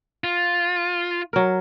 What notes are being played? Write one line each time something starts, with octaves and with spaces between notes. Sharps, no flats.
F4
F#3 A#4